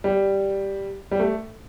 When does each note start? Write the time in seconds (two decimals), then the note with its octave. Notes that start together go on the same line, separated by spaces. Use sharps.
0.04 G3
1.11 G3
1.20 A3